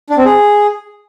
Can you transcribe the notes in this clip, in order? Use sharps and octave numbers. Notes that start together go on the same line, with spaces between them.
D4
C4
G#4